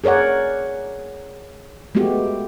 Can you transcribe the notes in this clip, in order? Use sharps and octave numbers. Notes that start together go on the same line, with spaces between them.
G#4 A#4 C#5 D5 F#5
G#3 A3 B3 F#4 G4